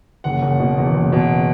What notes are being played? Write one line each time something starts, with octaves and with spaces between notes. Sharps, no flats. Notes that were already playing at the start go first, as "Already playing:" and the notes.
F#1 F#5
F#1
B2
E2
F#1
B2